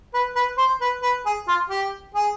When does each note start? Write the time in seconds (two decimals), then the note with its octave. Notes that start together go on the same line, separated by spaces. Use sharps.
0.14 B4
0.35 B4
0.58 C5
0.81 B4
1.02 B4
1.26 G#4
1.47 F4
1.70 G4
2.15 G#4